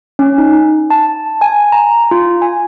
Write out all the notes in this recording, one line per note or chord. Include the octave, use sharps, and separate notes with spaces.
C#4
D#4
A5
G#5
A#5
F4
G#5